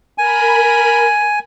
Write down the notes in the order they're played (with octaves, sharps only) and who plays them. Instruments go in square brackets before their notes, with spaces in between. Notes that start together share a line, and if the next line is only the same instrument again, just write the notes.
[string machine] A#4 B5 [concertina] G#5